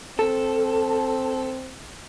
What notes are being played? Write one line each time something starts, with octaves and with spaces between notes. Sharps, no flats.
C4 A4